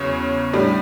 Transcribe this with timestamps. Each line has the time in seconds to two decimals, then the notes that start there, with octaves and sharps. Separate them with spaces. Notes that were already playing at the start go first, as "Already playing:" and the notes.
Already playing: E2 C#3 F#3 C#5
0.53 A2 G3 D4